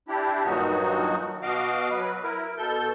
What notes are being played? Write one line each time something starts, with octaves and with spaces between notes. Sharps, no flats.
D4 E4 G4
G2 A#2 D#3 F#3 D#4 F#4
B2 F#4 D#5 F5 D6
F#3 B4
E4 A#4
B2 A4 G6